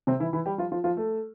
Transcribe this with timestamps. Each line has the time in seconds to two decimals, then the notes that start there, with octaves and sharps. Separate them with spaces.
0.07 C3 C4
0.20 E3 E4
0.33 E3 E4
0.46 G3 G4
0.58 F3 F4
0.72 F3 F4
0.84 F3 F4
0.97 A3 A4